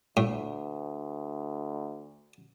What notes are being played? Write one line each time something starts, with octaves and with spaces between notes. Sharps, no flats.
D2 A2